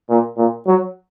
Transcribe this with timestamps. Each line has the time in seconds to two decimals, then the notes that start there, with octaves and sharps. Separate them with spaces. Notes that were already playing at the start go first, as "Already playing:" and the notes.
0.10 A#2
0.37 A#2
0.66 F#3